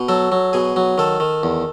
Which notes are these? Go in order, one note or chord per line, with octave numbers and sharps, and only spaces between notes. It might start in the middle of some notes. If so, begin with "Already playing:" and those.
Already playing: B2
F#3 A4
F#3
B2 G#4
F#3
D#3 A4
D#3
E2